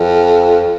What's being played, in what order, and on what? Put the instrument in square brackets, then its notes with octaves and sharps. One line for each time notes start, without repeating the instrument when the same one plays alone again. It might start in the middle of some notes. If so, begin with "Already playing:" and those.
Already playing: [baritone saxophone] F2